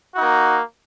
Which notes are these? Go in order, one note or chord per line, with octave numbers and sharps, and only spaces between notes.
A#3 D#4 F#4